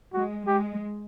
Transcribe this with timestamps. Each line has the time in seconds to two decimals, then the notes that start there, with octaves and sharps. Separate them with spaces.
0.14 G#3 F#4
0.47 G#3 G4